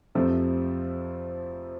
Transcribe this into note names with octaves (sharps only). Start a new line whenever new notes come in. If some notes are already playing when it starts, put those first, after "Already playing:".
F2 C3 F3 A3 C4